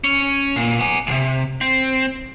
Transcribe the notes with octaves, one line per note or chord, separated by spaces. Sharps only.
C#4
A#2
B3 G#5
C#2 C3
C4